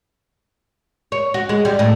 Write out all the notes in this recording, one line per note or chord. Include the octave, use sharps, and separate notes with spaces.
C#5
F#4
G#3
G3
A2